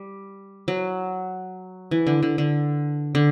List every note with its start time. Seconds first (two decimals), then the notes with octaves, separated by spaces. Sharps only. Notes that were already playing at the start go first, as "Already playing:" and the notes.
Already playing: G3
0.68 F#3
1.91 E3
2.07 D3
2.23 D3
2.38 D3
3.15 D3